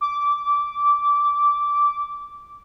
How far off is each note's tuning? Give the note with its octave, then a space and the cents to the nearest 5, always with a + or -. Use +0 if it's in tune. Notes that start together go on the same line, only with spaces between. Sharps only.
D6 -15